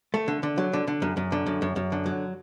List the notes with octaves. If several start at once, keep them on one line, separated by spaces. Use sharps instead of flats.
A3
D3
D3
F#3
D3
D3
F#2
F#2
D3
F#2
F#2
F#2
D3
F#3